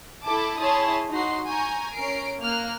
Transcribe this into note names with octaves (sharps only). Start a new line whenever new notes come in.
E4 A4 A5 D6
E4 G#4 C#5 A5 C6 D#6
D#4 F#4 C6 C7
G#5 A#5 C#6 G6
C#4 A#4 C7 D7
A#3 F6 F#6